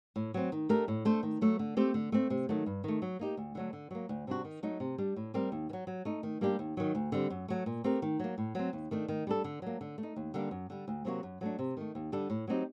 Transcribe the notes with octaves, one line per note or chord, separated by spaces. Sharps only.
A2
F#3 C4
D#3
A3 D4 G4 A#4
A2
A3 D4 A4 C5
D#3
F#3 A3
D3
A3 C4 G4 C5
D3
A3 C4
C3
D#3 F#3 A3
G2
D#3 A3
F#3
A#3 D#4 G4
D2
D3 F#3 A3
D3
F#3 A#3
D2
C3 G3 D4 F#4
D#3
F#3 A3 D#4
C3
G3 D4
A2
G3 C4 G4 A#4
D#2
D#3
F#3
F#3
A3 D#4
D#3
G3 A#3 D4 G4
D#2
D#3 F#3
D2
D3 G3 C4
F#2
F#3 A3
A#2
A3 C4 G4 A#4
D#3
F#3 A#3
A2
F#3 C4
D#2
D#3 A3 D4
D#3
G3 D4 A4
D3
F#3 A#3
D3
A3
D#4
D#2
D3 G3 A#3 D4
F#2
D3 G3
D2
C3 F#3 A#3 F#4
F#2
F#3 A3 D4
C3
D#3 A3
D#2
D3 G3 D4 A4
A2
F#3 C4 D#4 G4